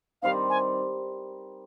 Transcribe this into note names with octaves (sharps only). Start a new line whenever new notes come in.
D#3 G3 C4 D#4 F5
G#5